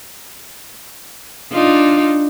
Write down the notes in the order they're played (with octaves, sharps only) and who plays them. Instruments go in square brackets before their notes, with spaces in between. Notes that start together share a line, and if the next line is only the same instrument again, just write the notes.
[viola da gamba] D4 D#4 F4